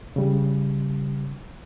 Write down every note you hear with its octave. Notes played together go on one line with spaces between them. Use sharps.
C#3 G3